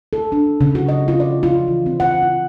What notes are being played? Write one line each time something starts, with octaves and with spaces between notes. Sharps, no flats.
A4
D4
C#3
F#4
D#5
F4
D5
F4
E3
C4
F#5
F4